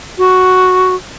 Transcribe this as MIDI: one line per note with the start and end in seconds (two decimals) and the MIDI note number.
0.18 0.95 66